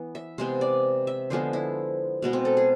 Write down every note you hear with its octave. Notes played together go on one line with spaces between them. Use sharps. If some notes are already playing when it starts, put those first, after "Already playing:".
Already playing: E3 B3
E5
C3 G#3 B3 C5
D5
E5
D3 F3 G#3 B3 C5
E4
B2 G#3 B3
C4
A4
G#4